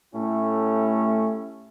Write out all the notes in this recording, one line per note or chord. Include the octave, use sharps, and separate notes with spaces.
A2 A3 C#4 E4 G4